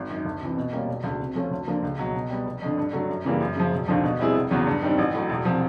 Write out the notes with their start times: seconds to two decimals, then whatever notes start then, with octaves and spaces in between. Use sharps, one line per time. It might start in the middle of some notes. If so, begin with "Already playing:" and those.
Already playing: G#1
0.09 F#2 D#3
0.25 D2
0.41 C3 E3
0.56 B2
0.72 G3 A#3 C#4 F4
0.88 E1
1.04 D2 C#3
1.20 C3
1.35 F3 A3 C#4 F4
1.51 D2
1.67 D3 F3 A#3
1.82 C#2
1.99 B2 F#3
2.14 B2
2.30 G3 B3
2.45 F1
2.61 F2 D3
2.77 G2
2.93 D3 F#3 A3
3.09 F#2
3.24 C#3 E3 G3 A#3
3.40 F#2
3.55 C#3 F3
3.72 E1
3.88 D#2 D3 F3
4.03 B2
4.19 G3 C4 E4 G#4
4.35 F1
4.51 E2 C#3 F#3 B3
4.67 G2
4.82 D#3 G3 C4
4.98 A1
5.14 A2 F#3
5.29 E1
5.45 C3 F3